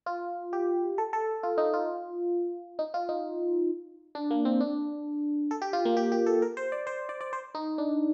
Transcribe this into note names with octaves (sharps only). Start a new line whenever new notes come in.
F4
G4
A4
A4
F4
D#4
F4
D#4
F4
D#4
D4
A#3
C4
D4
A4
G4
F4
A#3
G4
G4
A4
A#4
C5
D5
C5
D5
D5
C5
D#4
D4